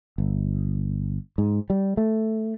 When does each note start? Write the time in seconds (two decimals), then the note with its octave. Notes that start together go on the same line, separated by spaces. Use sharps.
0.18 G1
1.38 G#2
1.70 G3
1.97 A3